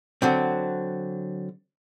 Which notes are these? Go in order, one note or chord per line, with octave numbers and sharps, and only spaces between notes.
D3 F#3 C4